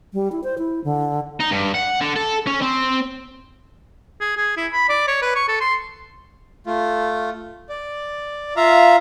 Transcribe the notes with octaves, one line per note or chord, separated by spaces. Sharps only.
G3
E4
C5
E4
D3
D#4
G2
F#5
D3
A4
C#4
C4
G#4
G#4
E4
B5
D5
C#5
B4
C#6
A4
C6
A3 F4
D5
F4 E5 F5 A#5